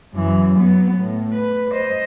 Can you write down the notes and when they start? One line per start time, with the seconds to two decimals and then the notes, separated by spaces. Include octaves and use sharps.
0.13 F#2 E3
0.55 F#3 B3
0.98 A2
1.33 B4
1.72 C5 D#5